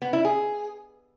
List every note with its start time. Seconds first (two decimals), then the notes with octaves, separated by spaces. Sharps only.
0.02 B3
0.13 E4
0.25 G#4